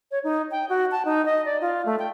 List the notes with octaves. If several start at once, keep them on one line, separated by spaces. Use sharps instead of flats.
C#5
D#4
G5
F#4
A5
D#4
D#5
D5
F4
A3
G5